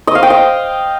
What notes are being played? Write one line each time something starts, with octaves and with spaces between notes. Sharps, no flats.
D#5
F5
G5
D#5